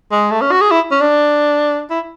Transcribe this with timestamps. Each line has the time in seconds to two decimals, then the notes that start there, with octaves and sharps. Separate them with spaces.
0.12 G#3
0.31 A3
0.41 C#4
0.51 F#4
0.61 G#4
0.71 E4
0.91 C#4
1.01 D4
1.90 E4